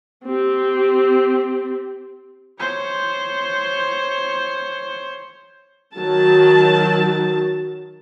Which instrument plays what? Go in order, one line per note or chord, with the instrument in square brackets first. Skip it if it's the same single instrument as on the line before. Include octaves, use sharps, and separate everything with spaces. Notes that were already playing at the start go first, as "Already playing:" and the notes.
[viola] C4 G4
[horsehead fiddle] C5 C#5
[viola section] D#3 F#3 A5